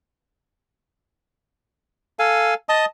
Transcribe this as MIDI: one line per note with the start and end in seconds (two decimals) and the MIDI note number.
2.19 2.54 69
2.19 2.54 77
2.19 2.54 80
2.69 2.85 75
2.69 2.85 81
2.69 2.85 87